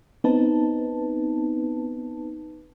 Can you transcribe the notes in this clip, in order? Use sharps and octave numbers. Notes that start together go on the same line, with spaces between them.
B3 C4 D#4 B4 A5